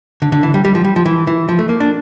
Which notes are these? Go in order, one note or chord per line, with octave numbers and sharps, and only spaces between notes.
D3
D3
E3
G3
G3
F3
G3
F3
E3
E3
F3
A3
A#3
D4